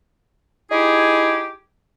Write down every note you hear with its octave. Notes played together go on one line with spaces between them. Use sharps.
D#4 E4 G4 G#4